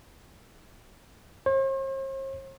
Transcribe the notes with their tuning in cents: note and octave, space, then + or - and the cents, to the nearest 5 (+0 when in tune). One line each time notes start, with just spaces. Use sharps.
C5 +45